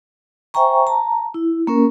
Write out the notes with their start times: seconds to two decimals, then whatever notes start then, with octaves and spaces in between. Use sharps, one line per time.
0.54 C5 E5 G5 G#5 A#5 C#6
0.87 A5 A#5
1.34 E4
1.67 A#3 C#4 A#4